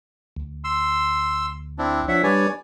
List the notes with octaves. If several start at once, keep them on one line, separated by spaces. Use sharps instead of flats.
D2
C6 E6
C4 D4 E4
F3 D4 C#5 E5 F#5
G3 D4 B4 C#5 D5 G#5